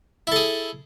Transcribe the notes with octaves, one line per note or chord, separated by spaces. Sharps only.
E4 G#4 A4